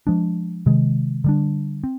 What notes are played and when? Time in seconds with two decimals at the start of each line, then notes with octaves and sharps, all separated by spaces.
0.07 F3 G#3 D4
0.66 C3 D#3 G#3
1.24 D3 G3 D4
1.84 C4